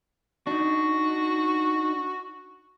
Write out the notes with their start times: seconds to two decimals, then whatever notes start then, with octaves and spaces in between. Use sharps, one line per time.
0.47 D4 D#4 F#4